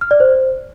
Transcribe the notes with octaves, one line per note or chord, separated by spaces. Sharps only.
F6
D5
C5